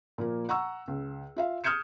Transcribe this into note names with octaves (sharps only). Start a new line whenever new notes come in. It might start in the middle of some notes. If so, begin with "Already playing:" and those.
A#2 F3 A#3
F#5 A#5 C#6 E6
C#2
F4 E5 F5
D#6 F6 G6 G#6 C#7 E7